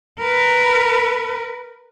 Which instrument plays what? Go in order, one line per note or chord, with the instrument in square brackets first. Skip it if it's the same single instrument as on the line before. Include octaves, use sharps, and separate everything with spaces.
[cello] A#4 B4